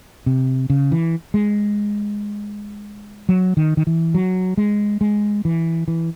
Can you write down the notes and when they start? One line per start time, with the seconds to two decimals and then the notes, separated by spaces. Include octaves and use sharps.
0.26 C3
0.70 C#3
0.92 E3
1.34 G#3
3.29 F#3
3.57 D#3
3.77 D#3
3.87 E3
4.14 F#3
4.57 G#3
5.01 G#3
5.45 E3
5.88 E3